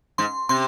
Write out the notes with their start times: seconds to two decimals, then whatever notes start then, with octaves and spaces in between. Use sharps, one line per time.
0.18 G#2 C6
0.49 C3 C6